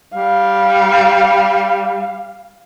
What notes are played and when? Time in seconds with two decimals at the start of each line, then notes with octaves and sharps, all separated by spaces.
0.14 G3 F5